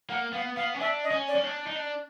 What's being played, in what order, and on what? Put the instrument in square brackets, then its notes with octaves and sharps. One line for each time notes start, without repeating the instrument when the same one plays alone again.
[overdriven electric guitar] A#3 [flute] F#5
[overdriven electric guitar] B3 [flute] F5
[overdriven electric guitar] B3 [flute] F5
[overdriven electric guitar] C#4
[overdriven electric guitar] D4 [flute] E5
[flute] D#5
[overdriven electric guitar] C#4
[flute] D5
[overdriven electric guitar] C#4
D4
D#4
D4